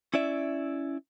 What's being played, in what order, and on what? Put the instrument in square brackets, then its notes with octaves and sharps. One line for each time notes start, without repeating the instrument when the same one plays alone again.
[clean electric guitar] C#4 E4 D5 E5